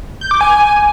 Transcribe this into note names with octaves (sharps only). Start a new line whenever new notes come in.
G6
D6
G#5